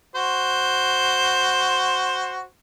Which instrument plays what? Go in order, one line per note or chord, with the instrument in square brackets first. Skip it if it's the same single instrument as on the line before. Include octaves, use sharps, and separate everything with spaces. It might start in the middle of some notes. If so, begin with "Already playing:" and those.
[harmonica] F#4 C5